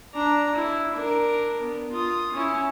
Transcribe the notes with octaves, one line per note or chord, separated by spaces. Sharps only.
D4 A#5
E4
D4 A#4
B3
F4 D#6
C#4 E4